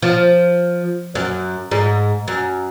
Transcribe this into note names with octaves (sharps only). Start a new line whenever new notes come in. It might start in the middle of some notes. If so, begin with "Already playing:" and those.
F3
F#2
G#2
F#2